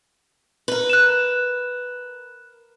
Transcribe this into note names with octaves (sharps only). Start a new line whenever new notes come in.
A#4 B4
F#6 E7